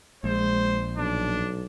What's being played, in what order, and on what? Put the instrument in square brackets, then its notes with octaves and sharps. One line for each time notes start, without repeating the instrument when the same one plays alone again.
[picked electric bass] A#1 [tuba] G#3 [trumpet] C5
[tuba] B1 [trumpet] D4